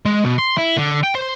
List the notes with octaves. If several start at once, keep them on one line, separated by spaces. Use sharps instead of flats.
G#3
B2
C6
E4
D3
G5
C5